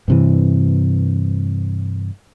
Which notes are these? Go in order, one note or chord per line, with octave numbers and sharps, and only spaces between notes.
G2 C3 E3